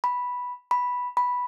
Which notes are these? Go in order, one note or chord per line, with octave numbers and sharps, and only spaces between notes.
B5
B5
B5